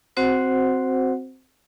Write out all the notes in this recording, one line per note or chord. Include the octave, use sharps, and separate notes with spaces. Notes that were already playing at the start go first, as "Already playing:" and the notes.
C4 F#4 C5 F#5